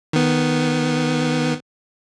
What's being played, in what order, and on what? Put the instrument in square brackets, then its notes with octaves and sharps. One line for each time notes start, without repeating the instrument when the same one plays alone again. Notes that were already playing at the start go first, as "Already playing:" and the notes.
[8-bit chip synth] D#3 B3